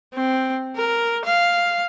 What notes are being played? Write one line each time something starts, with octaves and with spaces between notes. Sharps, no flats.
C4
A#4
F5